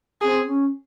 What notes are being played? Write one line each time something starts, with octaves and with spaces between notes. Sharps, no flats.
C4 G#4
C#4